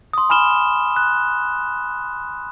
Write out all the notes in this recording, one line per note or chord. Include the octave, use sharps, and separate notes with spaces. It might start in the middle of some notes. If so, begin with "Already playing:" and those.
C6 D#6
G#5 B5 F6 E7 G7
F#6